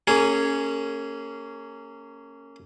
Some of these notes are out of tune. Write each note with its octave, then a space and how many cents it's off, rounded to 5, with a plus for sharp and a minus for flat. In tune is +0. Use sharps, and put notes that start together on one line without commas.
A#3 -25 C#4 +0 G#4 +0